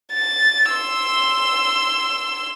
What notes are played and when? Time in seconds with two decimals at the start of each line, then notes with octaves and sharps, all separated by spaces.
0.14 A6
0.70 C6 E6